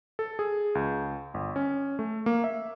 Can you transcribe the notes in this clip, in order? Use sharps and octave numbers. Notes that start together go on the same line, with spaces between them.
A4
G#4
C#2
G1
C#4
A3
A#3
E5